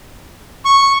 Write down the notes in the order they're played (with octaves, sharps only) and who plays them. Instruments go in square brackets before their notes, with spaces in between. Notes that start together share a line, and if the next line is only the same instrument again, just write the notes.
[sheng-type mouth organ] C#6